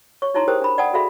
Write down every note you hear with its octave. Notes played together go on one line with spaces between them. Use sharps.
C#5 C#6
D#4 E4 C#5 A5 A#5 C6
G4 G#4 A#4 C5 G5 D#6
D4 B5
D5 F#5 G5 A5 D#6
F#4 G#4 A4 E5 F5 B5